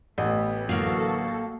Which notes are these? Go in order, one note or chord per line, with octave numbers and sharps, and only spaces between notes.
A1 A3 B3
D3 E3 F#3 A#3 F#4 A4 F5